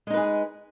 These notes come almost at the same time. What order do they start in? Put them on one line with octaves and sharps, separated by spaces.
G#3 D#4 B4 G#4